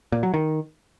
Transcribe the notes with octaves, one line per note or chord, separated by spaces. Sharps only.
A#2
F#3
D#3